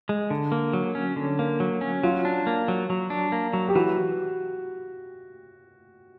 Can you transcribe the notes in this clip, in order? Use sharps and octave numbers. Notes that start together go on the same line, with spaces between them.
G#3
D3
A#3
F#3
C#4
D3
A#3
F#3
C#4
F#3 F4
D4
A#3
F#3
F#3
D4
A#3
F#3
G4
E3 F#4